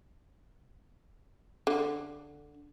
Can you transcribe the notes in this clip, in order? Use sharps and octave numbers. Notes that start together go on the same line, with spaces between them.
D3